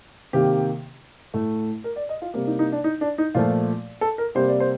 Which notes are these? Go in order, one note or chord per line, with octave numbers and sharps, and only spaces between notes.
C3 D#3 A#3 G4
A2 A3
A#4
D5
D#5
F4
C3 G3 A#3
D#4
D#4
D4
D#4
D4
D#4
A#2 F3 A3 F4
A4
A#4
C3 G3 A#3 C5
D5
C5